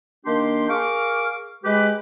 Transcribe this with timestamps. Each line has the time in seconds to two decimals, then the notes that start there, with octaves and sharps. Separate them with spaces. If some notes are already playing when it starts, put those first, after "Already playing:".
0.25 D#3 A#3 D4 G4 C6
0.69 G#4 A#4 F5 C#6 D6 F6
1.64 G#3 G4 B4